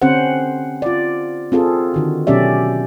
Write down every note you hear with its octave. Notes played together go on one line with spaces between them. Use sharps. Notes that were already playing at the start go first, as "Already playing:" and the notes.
D3 C4 C#4 G4 C5 F#5
F4 D5
C4 F4 G#4 A4
D3 D#3 F#4
B2 F#3 C#4 G4 D5 E5